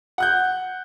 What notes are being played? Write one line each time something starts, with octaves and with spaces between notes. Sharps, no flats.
F#5 F#6 G6